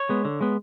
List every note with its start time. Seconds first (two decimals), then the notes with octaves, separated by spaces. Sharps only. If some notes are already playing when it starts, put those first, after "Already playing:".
Already playing: C#5
0.09 G#3 B3
0.25 D3
0.41 G#3 B3